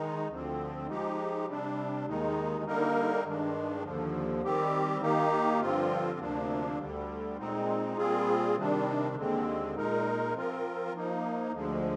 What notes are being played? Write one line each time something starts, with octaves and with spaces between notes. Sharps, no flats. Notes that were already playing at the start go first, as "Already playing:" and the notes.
Already playing: D#3 G#3 D#4
D2 D3 F3 C4
F3 G#3 D#4 G4
C3 G3 D4
D#2 D#3 G#3 D#4
D3 G3 A#3 D#4 A#4
G2 D#3 G#3 D4
D#2 D3 F3
D#3 G3 C4 G4
D#3 A#3 D#4 G4
G2 D3 F3 C4 F4
D2 C3 F3 A#3 D4
D2 D3 G3
A#2 G#3 C4 D#4
A#2 G3 C4 F4 G#4
C3 D#3 G3 D4
D#2 D3 G#3 C4
A#2 G#3 D#4 A#4
F3 C4 F4 A#4
F3 A#3 D#4
D2 D3 F3 G#3